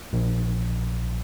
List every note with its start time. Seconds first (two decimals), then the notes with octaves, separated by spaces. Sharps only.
0.13 A#1